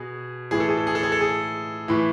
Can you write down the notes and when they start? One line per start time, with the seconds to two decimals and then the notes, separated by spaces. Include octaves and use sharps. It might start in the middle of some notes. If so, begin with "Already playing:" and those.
Already playing: B2 G#4
0.51 A2 E3 G#4
0.60 A4
0.69 G#4
0.77 A4
0.87 G#4
0.95 A4
1.03 G#4
1.12 A4
1.21 G#4
1.88 A2 E3